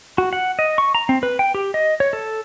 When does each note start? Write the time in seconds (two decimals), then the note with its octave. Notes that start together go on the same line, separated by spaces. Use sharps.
0.18 F#4
0.33 F#5
0.59 D#5
0.78 C#6
0.95 A#5
1.09 C4
1.23 B4
1.39 G5
1.55 G4
1.74 D#5
2.00 C#5
2.13 A4